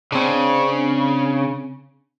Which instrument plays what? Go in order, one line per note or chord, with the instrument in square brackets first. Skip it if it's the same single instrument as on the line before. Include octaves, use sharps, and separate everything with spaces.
[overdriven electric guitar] C#3 [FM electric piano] C4 D4